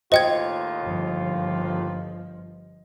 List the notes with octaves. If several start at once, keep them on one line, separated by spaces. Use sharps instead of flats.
D#2 A2 F4 C5 D#5 G5 G#6
G1 F3